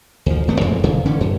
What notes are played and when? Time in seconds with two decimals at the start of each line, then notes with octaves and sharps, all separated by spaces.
0.26 D2 F3
0.47 D#1 A3 B3
0.61 A1 F2 D3 G#3
0.84 E1 F2 C#3
1.05 D3 E3 A3 C#4
1.21 F#2